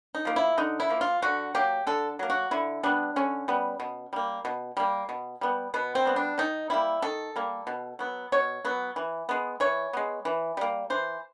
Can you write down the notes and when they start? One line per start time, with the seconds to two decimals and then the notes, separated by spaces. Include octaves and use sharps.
0.15 D#4
0.25 F3 A#3
0.36 E4
0.58 D3 D#4
0.80 E4
0.90 F3 A#3
1.01 F4
1.22 D3 F#4
1.55 F#3 A#3 G4
1.87 D3 A4
2.19 F#3 A#3
2.30 F#4
2.51 D3 E4
2.83 G3 B3 D4
3.16 D3 C#4
3.48 G3 B3
3.80 B2
4.13 G3 A#3
4.45 B2
4.77 G3 A#3
5.09 B2
5.41 G3 B3
5.74 B2 B3
5.95 C4
6.05 G3 B3
6.16 D4
6.38 D#3 D#4
6.70 G3 A#3 E4
7.02 D#3 A4
7.36 G3 A#3
7.67 B2
7.99 F#3 B3
8.32 B2 C#5
8.65 F#3 B3
8.96 E3
9.29 G#3 B3
9.60 E3 C#5
9.93 G#3 B3
10.25 E3
10.57 G3 A#3
10.90 E3 C5